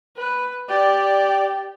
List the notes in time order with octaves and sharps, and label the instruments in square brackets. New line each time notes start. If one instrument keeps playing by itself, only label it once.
[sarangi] B4
[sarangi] G4 [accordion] D5